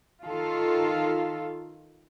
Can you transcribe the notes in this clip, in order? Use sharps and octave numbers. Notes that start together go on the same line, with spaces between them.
D#3 F4 A4